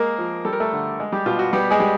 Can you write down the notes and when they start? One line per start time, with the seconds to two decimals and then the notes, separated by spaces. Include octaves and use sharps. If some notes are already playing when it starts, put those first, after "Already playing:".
Already playing: G#3 A#3 A#4
0.18 F3
0.45 G3 A4
0.53 A#4
0.60 A3 A4
0.73 D3
1.00 G#3
1.12 G3 G4
1.26 B2 F4
1.39 F#4
1.53 G3 B3 G4
1.71 G#3 G#4
1.80 G3